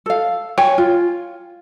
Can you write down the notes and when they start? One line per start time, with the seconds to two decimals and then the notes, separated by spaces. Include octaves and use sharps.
0.06 A4 F5
0.58 C#5 G5 G#5
0.78 F4